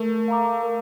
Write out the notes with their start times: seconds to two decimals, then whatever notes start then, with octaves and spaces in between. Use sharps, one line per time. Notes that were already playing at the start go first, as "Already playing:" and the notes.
Already playing: A3 A#4
0.28 F5 A#5 D6
0.63 A#4